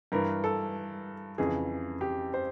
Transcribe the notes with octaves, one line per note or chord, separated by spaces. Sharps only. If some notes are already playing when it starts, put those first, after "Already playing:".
G2 E3 A#4
A4
F2 C#3 E3 G#4
G4
C5